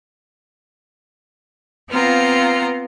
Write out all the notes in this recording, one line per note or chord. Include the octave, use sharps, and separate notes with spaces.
B3 C4 F4 F5 A#5